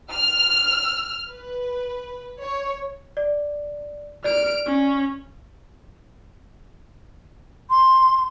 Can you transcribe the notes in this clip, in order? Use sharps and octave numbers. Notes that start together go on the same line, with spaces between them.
F6
B4
C#5
D5
D5 F6 D7
C#4
C6